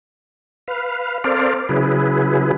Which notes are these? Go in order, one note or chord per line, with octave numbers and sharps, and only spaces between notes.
B4 F5
C4 A4 A#4 C5 D5 F5
C#3 F#3 E4 G#4 B4